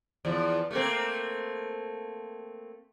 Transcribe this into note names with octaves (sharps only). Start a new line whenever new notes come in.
E2 F3
A3 A#3 C4